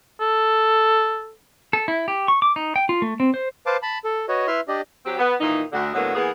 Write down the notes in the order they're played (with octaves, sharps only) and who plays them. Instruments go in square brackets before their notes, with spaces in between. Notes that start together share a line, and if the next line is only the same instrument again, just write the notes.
[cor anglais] A4
[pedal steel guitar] A4
E4
G4
C#6
D6
D#4
G5
F4
A3
C4
C5
[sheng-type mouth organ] B4 C5 F5 A5 D6
A5 B5
A4
F#4 B4 C#5 D#5
E4 B4 E5 C6 F6
D4 G4 D5 D#5
[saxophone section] F#3 C4 G4
B3
A#2 D#3 E3 D#4
D2 D3 F#4
A2 D3 F#3 G#3 A#3 B3
E3 A#3 B3 G#4